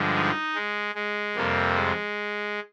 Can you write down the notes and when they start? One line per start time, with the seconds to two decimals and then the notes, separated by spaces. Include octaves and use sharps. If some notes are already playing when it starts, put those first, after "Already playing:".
Already playing: G2 D3 F3 G#3
0.15 D#4
0.55 G#3
0.95 G#3
1.36 F2 C3 G3 A#3
1.75 G#3